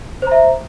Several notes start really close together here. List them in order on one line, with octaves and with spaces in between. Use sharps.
C5 A#5 E5